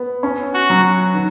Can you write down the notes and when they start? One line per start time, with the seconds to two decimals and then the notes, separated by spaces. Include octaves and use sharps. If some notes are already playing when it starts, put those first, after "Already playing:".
Already playing: B3
0.23 C#4
0.54 F#4
0.70 F#3
1.14 D#3